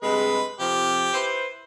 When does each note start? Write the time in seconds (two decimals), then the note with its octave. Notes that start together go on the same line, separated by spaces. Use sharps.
0.03 G2 C3 G#3 B4
0.60 F2 C3 F3 G4
1.14 E4 B4 C5